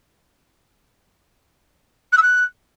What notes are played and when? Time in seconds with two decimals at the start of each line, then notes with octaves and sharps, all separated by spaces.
2.12 F#6
2.17 E6
2.22 F#6